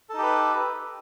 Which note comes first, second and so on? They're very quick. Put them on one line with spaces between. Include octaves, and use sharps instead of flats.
A4 D#4 G4 B4